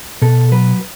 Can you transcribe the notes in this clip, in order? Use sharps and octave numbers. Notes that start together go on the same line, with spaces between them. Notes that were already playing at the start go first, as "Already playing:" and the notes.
B2 A4
F#3 B4